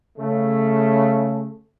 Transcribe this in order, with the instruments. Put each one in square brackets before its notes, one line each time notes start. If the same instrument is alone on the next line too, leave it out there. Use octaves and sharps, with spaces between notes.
[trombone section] C#3 A3